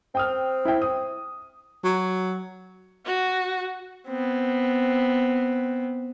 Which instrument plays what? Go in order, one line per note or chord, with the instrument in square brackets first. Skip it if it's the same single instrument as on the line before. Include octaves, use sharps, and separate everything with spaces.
[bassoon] C4 [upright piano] G5 D#6 F6
[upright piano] E4 G5
D#6
[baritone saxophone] F#3
[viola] F#4
[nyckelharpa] B3 C4